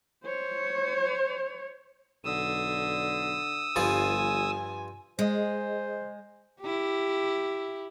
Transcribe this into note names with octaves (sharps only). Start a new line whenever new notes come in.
C5 C#5
B1 D3 D#6 E6
G1 G2 F3 F4 G#5
G#3 G#4 C5 D#5
E4 G4